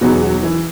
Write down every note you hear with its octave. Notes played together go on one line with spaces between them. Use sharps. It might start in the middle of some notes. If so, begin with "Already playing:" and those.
E2 B2 F#3 G#3 B3 D#4
F#3
E3